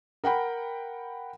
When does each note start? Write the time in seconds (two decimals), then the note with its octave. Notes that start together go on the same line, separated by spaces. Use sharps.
0.24 A#4 F#5 G5 B5